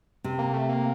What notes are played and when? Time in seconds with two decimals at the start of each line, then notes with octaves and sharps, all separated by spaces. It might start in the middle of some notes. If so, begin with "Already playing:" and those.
0.24 C3
0.39 A#3
0.53 A3
0.69 A#3